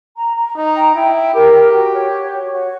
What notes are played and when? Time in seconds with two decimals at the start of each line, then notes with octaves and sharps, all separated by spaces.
0.16 A#5
0.36 A#5
0.56 D#4 A#5
0.75 G5
0.95 E4 G5
1.15 G5
1.34 G4 A#4
1.54 G5
1.73 F#4
1.93 C#5
2.13 F#4
2.33 C#5
2.52 F#4